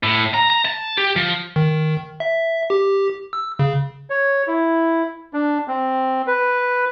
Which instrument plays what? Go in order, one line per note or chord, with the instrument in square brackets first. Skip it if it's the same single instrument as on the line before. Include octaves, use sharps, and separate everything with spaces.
[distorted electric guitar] A2
A#5
A#5
A5
G4
F3
[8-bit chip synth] D#3
E5
G4
E6
C#3
[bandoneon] C#5
E4
D4
C4
B4